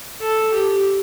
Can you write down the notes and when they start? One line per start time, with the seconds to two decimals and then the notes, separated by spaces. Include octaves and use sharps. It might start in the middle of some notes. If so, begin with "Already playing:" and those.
0.20 A4
0.52 G4